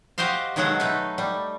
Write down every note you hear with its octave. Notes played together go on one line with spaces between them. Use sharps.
F#4 G4 C5 D#5 F5
B2 D#3 F#3 G#3 A4 F#5
A3 D#4 B4
G3